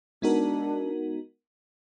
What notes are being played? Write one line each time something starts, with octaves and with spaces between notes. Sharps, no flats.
G#3 B3 D4 D#4 F#4 A#4